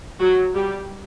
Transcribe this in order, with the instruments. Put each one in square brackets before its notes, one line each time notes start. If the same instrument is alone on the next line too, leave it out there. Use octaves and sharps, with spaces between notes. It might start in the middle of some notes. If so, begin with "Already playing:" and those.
[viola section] F#3 F#4
G3 G4